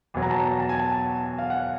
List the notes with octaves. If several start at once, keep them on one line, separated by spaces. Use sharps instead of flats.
E2 B2 F#3
A#5
A5
A#5
A5
G#5
A5
F5
F#5